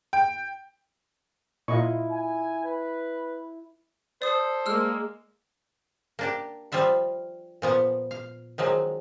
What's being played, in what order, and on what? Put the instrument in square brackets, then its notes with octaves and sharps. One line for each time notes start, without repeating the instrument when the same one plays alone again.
[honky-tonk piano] G5
[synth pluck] A#2 [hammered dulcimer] E4 [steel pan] F4 D#5 C#6
[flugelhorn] G#5
B4
[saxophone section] A4 C5 [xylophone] D5 D#6
[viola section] G#3 A#3 [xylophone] E6 F6
[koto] A#3 D4 G4
F3 G3 F4 E5 F#5
A#2 F3 B3
F5
D#3 F3 F#3 G#3